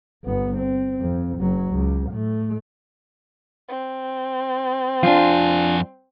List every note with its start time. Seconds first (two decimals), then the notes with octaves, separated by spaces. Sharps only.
0.25 G1 B3
0.58 C4
1.00 F2
1.39 F#1 F#3
1.71 C#2
2.11 A2 A3
3.69 C4
5.03 F2 D4 F4 G#5